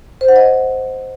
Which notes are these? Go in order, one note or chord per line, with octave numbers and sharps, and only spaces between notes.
C5
F#5
D#5